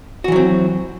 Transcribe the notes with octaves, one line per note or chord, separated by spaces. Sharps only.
E3 F#3 C4 F#4